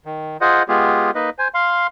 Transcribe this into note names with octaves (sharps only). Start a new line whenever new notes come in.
D#3
F4 G#4 C5 D#5 F#5
G#3 B3 F4 G4 G#4
A#3 D#4 B4 D#5
C5 G#5
F5 C6